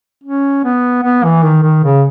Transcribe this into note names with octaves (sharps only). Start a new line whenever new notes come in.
C#4
B3
B3
E3
D#3
D#3
C#3